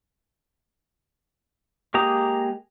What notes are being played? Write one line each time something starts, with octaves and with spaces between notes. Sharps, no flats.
G#3 A#3 G4 A#5 D#6